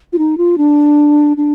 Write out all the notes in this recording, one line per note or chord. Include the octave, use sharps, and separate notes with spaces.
F4
D#4
F4
D4
D4